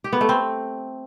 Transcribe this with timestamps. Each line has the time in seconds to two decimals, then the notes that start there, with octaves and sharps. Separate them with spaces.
0.04 G4
0.13 B3
0.21 A3
0.29 C4